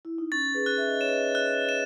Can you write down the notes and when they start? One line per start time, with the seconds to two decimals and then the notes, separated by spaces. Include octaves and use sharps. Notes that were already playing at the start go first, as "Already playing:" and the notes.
0.05 E4
0.18 D#4
0.32 C#4 A6
0.54 G#4 B4
0.66 F#6
0.78 E5
0.88 D#5
0.99 C#5 E7
1.09 B4 D#5
1.35 F#6
1.69 E7